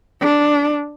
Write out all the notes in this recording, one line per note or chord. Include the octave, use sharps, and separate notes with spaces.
D4